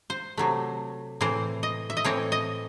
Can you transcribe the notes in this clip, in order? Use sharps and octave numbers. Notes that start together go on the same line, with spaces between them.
C5
C3 F#3 A3
A2 E3 C4 C5
D#5
E5
D#5
A2 E3 C4 C#5
D#5